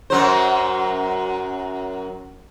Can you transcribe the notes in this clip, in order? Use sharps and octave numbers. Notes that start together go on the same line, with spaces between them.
F#2 F#3 C5